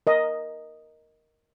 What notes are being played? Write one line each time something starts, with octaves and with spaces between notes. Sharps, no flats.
A#4 D#5